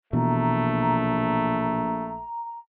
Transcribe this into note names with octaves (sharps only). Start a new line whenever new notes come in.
A#1 B2 E3 A3 A#5